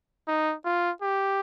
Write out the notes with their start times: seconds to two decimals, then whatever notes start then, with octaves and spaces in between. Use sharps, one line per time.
0.28 D#4
0.65 F4
1.02 G4